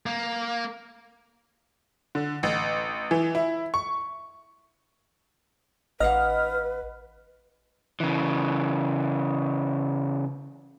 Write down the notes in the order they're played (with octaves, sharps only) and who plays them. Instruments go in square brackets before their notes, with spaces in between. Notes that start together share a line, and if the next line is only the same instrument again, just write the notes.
[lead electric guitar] A#3
[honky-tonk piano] D3
A1
E3
E4
C#6
[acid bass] A1 [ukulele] D#4 F5 F#5 [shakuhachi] B4 [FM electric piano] D#5 F6
[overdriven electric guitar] C#3 E3